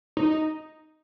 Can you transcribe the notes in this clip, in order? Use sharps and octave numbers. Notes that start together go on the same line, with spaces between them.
D#4